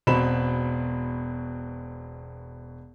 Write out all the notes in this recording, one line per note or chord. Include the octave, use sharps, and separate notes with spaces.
E1 B2 C4 B5 E7